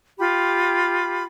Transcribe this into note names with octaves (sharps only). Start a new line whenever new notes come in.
F4 G4 B5